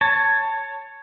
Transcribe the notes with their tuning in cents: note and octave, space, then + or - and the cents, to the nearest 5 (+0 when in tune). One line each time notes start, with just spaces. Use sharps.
C#5 +0 A5 +15